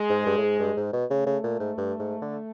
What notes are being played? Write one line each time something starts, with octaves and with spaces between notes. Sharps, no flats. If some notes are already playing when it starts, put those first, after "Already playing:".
Already playing: G#3
G#2
G2
A2
G#2
G2
G#2
B2
C#3 A3
C#3
A#2
G#2
G2
G#2
D3